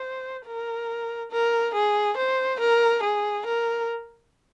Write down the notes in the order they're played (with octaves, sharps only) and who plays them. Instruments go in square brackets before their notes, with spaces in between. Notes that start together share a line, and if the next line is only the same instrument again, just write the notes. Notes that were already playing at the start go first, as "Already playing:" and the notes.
Already playing: [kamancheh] C5
A#4
A#4
G#4
C5
A#4
G#4
A#4